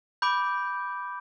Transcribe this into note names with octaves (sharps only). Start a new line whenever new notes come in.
B5 D6 G6 D7